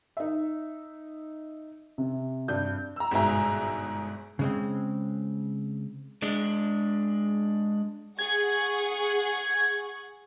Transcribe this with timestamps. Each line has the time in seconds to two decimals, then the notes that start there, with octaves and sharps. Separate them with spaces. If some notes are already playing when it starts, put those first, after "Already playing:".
0.17 D#4 E5
1.98 C3
2.48 G2 G6
2.96 A#5 E6
3.11 G1 G#2 B2 G#4 E5 A#5
4.39 C#3 G#3 C4
6.23 G#3 D4
8.19 G#4 F#5 C#6 G#6